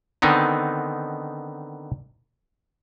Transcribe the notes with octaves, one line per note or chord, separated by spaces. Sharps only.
D3 D#3 B3 C4 D#4